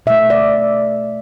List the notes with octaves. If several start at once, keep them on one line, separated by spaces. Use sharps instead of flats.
B2 A3 E5
D5